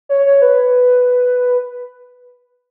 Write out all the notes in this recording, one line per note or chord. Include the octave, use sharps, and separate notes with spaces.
C#5
C#5
B4